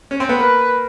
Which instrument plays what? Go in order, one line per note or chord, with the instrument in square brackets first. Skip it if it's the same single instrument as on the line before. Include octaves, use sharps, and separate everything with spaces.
[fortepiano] C#4
C4
B3
[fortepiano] A#3 [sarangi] B4